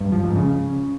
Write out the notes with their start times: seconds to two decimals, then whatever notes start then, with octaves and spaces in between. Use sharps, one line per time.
0.01 G2
0.12 F3
0.24 G#2
0.36 C#3